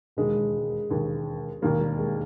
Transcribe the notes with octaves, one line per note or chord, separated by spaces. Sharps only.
E1 D#2 C#3 G#3
E1 D#2 C#3
E1 D#2 D#3 G3 A#3
G3
G#3